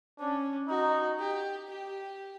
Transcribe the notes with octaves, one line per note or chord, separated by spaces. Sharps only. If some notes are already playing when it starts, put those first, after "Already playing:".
C#4 D4
D#4 F#4
G4
G4